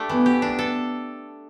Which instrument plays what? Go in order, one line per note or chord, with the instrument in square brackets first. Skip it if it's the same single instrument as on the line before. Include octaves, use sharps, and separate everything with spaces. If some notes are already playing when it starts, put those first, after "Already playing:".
Already playing: [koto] A3 D4 G4
[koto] E3 [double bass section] B3
[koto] G4
D4
A4